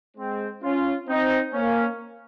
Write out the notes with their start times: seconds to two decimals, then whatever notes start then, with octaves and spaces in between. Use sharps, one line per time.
0.17 G#3 C4
0.63 C#4 F4
1.08 C4 D#4
1.53 A#3 C#4